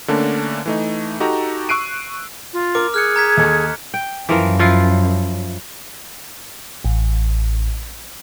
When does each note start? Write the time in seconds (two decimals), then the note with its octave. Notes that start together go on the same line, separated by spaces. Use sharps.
0.08 D3 A3 A#3 C#4 D4
0.66 E3 A3 D#4
1.20 D#4 F#4 G4 A4 A#5
1.69 C#6 E6 F#6 C7 D7 D#7
2.54 F4
2.75 A#4 D6
2.94 G#4 F6 F#6 C#7
3.16 A#5 G#6 B6
3.37 D#2 A4 D6
3.94 G5
4.29 F#2 E3 F3 A#4
4.59 F3 E4 F4
6.85 A1